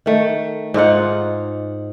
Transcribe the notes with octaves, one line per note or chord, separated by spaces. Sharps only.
D#3 A3
G#2 D#4 F4 F#5